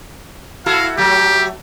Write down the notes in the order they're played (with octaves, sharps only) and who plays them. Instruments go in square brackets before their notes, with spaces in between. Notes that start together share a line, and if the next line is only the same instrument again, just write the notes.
[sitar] E4 F#4 A4 [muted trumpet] F5
[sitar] F#3 A3 [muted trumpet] G4